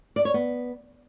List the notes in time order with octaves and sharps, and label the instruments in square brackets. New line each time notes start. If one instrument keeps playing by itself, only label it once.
[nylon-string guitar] D5
C#5
B3